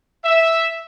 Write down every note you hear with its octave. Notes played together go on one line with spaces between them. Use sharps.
E5